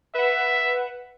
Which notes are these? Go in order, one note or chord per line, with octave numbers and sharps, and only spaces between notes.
B4 E5 F#5